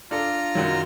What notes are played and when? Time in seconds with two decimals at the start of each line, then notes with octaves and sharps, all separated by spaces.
0.11 D4 F4 A4 A#5 F6
0.55 F#2 D#3 F#3